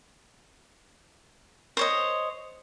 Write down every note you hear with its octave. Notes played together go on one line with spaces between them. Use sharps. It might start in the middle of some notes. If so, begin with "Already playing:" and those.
C5 C#5 D#5